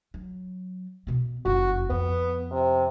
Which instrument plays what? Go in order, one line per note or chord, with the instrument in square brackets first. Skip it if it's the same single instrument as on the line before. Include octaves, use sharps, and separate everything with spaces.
[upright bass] F#3
B2 B3
[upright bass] F#1 F2 [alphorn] F#4
[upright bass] F2 [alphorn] B3
[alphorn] C3